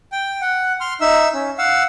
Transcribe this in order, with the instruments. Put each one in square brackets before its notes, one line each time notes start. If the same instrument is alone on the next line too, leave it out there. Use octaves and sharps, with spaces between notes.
[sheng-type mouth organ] G5
F#5
C6 F6
D#4 E5 E6
C#4
F5 F#5 E6